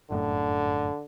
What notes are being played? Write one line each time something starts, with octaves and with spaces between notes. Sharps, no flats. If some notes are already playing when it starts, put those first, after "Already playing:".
G1 F#2 A2 D3